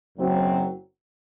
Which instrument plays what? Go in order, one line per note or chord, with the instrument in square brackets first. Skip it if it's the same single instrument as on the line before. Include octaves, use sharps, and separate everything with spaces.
[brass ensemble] F#1 F#2 F#3 C4